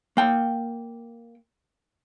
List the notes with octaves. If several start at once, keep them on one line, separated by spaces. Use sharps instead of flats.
A#3 G5